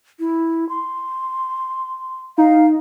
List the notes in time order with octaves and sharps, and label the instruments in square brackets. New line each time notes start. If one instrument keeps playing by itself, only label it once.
[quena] E4
C6
[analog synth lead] D#4 [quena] F5